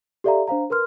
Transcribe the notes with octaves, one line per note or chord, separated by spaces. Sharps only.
G4 A4 D5 E5 F5 A#5
D4 C5 F5 A#5
A#4 B4 C6 F6